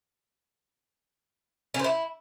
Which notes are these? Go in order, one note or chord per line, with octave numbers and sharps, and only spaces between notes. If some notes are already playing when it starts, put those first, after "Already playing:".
C#4
C5
E4